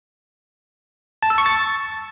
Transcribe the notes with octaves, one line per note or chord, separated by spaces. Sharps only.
A5
E6
C#6
A6